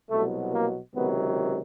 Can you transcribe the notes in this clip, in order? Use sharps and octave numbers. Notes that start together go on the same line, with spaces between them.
C2 B2 F#3 A3
A#3
C#2 C3 D#3 F#3 B3